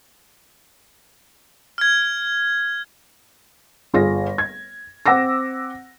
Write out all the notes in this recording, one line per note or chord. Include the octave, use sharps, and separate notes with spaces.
F6 G#6
G1 F4 G#4 A#6
G#6
C4 F#5 D6 E6 A#6